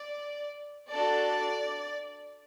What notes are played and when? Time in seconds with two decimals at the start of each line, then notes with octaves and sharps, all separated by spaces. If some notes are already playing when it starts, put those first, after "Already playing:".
Already playing: D5
0.91 D4 F#4 A4 D5